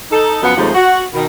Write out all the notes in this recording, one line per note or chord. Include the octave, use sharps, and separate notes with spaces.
D#4 A4
F#2 F3 B3 F#5
D#2 C3 F3 G#3 A3 C5
F#4
B2 D#3